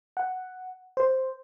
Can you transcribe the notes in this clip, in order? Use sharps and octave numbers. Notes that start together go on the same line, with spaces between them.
F#5
C5